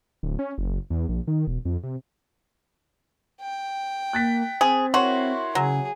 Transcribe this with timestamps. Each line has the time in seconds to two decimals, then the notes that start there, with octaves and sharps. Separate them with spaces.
0.23 D1
0.39 C#4
0.58 F#1
0.90 E2
1.09 A#1
1.28 D#3
1.47 E1
1.65 F2
1.83 C3
3.41 G5
4.13 A#3 F#6 A6 B6
4.61 C4 G#4 C5
4.94 E4 F#4 A#4 C#5 C6
5.55 C#3 F#3 G#4